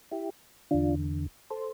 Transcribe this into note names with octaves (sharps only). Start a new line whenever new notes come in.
E4 G4
E2 D3 D4 F4
A4 C5